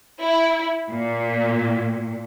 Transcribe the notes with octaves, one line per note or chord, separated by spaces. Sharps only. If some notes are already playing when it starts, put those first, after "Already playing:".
E4
A#2